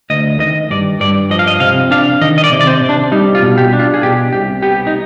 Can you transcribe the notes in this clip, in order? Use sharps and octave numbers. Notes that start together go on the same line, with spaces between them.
D2 D#5
D#3 D#5
G2 D5
G2 D5
F3 D#5
F5
D#5
C3 F5
D4 F5
D#3 D#5
D#5
D5
C3
D5
C5
C3
D4
G3 D#4
F4
B2
G4
D4
F4
G#4
B2 G4
C2 G4
B3 G4
D#4